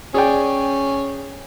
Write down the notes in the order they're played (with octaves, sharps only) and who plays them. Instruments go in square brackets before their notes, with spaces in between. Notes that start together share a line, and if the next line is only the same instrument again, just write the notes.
[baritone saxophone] C#4 [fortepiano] G#4 D5 G5